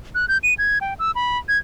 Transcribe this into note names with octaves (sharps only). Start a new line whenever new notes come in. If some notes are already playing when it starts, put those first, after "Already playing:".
F#6
G6
D#7
G#6
G5
E6
B5
G#6